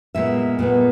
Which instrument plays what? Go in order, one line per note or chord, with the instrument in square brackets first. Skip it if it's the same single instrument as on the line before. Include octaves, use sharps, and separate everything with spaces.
[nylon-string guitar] A#2 G#3 B3 E5
A#2 G#3 B3